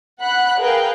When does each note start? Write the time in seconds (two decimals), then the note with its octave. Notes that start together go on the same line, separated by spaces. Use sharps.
0.20 F#5 B5 F#6
0.58 G#4 A#4 B4 F5 G5